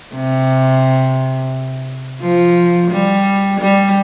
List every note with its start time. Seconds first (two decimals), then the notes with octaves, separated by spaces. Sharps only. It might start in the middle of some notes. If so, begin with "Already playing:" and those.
0.15 C3
2.22 F3
2.91 G3
3.61 G3